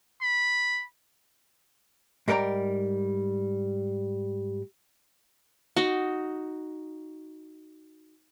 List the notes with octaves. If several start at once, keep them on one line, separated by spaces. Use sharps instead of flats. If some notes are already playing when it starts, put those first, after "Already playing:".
B5
G#2 G3 A#4 D5 G5 A#5
D#4 F#4